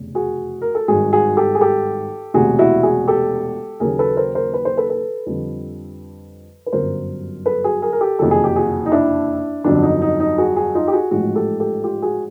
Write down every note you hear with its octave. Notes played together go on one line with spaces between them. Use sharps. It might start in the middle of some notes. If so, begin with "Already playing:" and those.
Already playing: F1 E2 C#3
F#4 G#4
A#4
A4
G#1 G2 D#3 F#4 G#4
F#4 G#4
G4 A4
G#4
G4 A4
E1 D2 C3 F#4 G#4
E4 F#4
F#4 G#4
G4 A4
D#2 C#3 F#3 G#4 A#4
A4 B4
A#4 C5
A#4 C5
B4
C5
A4 B4
A4 B4
F2 D3 G3
B4
G1 F#2 D3 F#3 A#4 C5
A4 B4
F#4 G#4
G#4 A#4
A#4
G4 A4
F#1 F2 C3 D#3 F#3 A4
G#4
G4
F#4 G#4
D#4
D4 E4
G1 F2 D3 F#3 D4
D#4
D#4
D#4
F#4 G#4
F#4 G#4
D#4 F4
G4
F#4 G#4
A1 G#2 F3 F#4 G#4
G4 A4
G4 A4
F4 G4
F#4 G#4